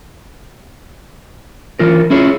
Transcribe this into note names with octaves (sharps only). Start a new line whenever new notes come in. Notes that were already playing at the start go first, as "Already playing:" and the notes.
E3 F4 A#4
C#4 E4 F4 G#4 C#5